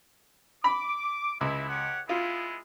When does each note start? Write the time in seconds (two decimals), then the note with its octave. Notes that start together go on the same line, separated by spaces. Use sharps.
0.64 B5 D6
1.41 C#2 E4
1.69 G4 C#5 F#5
2.09 G#3 B3 E4 F4